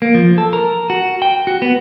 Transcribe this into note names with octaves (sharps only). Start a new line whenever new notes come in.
A#3
F3
A4
A#4
F#4
G5
F#4
B3